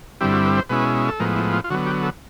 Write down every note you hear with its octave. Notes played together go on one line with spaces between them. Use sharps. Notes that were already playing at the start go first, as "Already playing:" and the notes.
G2 D3 G3 C4 E4 G4
F#4
B4
C5
B2 G#3 C#4 E4 B4
A4
A2 F3 G#3 B3 A#4
E4
F4
F4
D3 F#3 B3 F#4
G4
A4